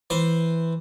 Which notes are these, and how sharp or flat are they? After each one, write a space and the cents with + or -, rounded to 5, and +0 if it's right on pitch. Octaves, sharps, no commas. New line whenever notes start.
E3 +0 C5 +0